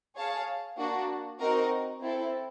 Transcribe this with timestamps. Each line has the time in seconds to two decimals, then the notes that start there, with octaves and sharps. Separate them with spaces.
0.15 G#4 C#5 F5 A5
0.77 A#3 D4 F#4
1.39 C4 D#4 F#4 A#4 D#5
2.00 C4 E4 A4